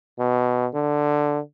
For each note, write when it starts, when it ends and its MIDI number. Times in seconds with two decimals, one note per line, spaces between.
0.19 0.67 47
0.74 1.39 50